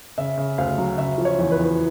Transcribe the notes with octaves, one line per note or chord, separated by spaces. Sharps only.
C#3 E5
C#3
D2 F5
F#3
C#3 E5
F3
C#5
E2
B4
E2